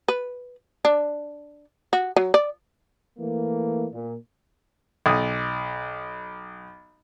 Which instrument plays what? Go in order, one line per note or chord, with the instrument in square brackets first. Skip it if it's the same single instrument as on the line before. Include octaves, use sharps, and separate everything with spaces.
[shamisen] B4
D4
F#4
F#3
D5
[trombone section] E3 A3 A#3
A#2
[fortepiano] B1 D#6